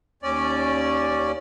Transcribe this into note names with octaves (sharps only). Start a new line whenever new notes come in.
D#2 C#4 D5